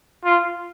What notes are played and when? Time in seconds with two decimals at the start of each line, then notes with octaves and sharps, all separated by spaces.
0.25 F4